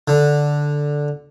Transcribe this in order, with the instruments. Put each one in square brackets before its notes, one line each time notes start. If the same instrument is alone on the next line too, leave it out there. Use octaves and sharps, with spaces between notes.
[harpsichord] D3